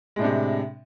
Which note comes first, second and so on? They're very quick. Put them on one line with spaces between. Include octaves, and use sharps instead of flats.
G#3 A2 D4 C3